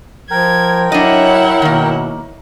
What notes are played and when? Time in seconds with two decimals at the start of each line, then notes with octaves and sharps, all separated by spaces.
0.31 F3 A#4 G5 G#6
0.92 F#3 D4 E4 C#5 D#5 F#5
1.62 B2 D#3 A#3